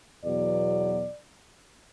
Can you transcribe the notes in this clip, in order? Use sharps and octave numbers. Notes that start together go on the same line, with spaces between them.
E2 B2 F#3 D5